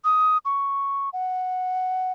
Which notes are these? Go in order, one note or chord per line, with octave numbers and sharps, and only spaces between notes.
D#6
C#6
F#5